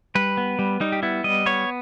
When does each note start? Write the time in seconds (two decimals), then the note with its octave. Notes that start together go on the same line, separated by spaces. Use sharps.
0.15 G3 B4
0.37 B3
0.59 G3
0.80 G3 D#4
0.92 G4
1.03 B3 E4
1.24 G3 D#5
1.46 B3 C#5